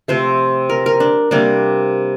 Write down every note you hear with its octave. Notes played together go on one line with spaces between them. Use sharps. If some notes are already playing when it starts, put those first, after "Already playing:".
C3 F3 A3 C5
A#4
A#4
D4
C3 G3 A#3 D4